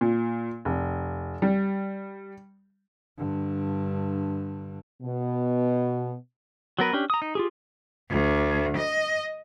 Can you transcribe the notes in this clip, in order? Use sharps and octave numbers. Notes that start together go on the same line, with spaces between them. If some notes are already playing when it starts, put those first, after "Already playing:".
A#2
F1
G3
G2 D3
B2
F#3 B3 A#4 B4
C#4 D4 G4
A#5 D#6
D#4
F4 G4 G#4
D2
D#5